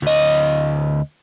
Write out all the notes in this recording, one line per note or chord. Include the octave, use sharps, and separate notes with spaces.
D2 D#5